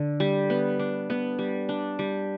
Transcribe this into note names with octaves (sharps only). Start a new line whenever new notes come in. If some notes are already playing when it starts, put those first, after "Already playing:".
Already playing: D3
G3
B3
D4
B3
G3
D4
G3